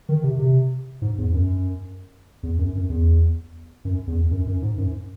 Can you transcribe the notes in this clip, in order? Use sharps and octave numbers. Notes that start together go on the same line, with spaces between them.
D#3
C3
C3
G#2
E2
F#2
E2
F#2
F#2
E2
F#2
E2
F#2
F#2
G#2
F#2